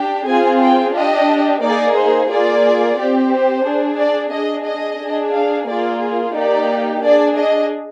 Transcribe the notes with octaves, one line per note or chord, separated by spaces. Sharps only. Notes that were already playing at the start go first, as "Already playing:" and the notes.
Already playing: D4 G4
C4 F4 G#4 G#5
G5
D4 G4 D#5
A#3 D#4 G#4 D5
C5
A#3 F4 G#4 D5
C4 G4
C5
D4 G#4
D5
D4 G#4 D#5
D#5
D4 G#4
F5
A#3 F4 G#4 D5
A#3 D#4 G4 D5
D4 G#4 D5
D#5